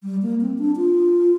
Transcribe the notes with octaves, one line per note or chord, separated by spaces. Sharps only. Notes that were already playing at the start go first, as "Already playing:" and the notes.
G3
A#3
C4
D4
F4